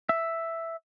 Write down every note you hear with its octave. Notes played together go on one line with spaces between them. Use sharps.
E5